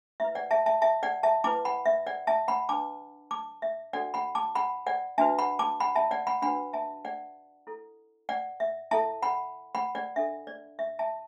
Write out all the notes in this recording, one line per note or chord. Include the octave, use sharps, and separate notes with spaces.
E4 B4 E5
D5 F#5
E5 A5
E5 A5
E5 A5
D5 F#5
E5 A5
E4 B4 A5 D6
F#5 B5
E5
D5 F#5
E5 A5
F#5 B5
D4 B4 A5 D6
A5 D6
E5
D4 F#4 A4 D5 F#5
F#5 B5
A5 D6
F#5 B5
D5 F#5
D4 F#4 B4 E5 A5
F#5 B5
A5 D6
F#5 B5
E5 A5
D5 F#5
F#5 B5
D4 F#4 B4 F#5 B5
E5 A5
D5 F#5
E4 A4
D5 F#5
E5
E4 A4 E5 A5
F#5 B5
F#5 B5
D5 F#5
D4 A4 E5
D5
E5
E5 A5